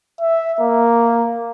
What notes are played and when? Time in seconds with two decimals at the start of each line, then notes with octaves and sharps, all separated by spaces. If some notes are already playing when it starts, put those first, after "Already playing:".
0.21 E5
0.61 A#3